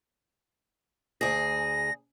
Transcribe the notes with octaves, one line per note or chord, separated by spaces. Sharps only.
D2 G#4 A#6